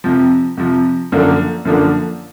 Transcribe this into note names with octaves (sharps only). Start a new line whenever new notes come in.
F2 C3 F3
F2 C3 F3
F#2 D3 F3 A#3 D4
F#2 D3 F3 A#3 D4